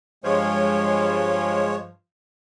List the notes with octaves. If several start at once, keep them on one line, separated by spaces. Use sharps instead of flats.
G2 F3 G#3 C#5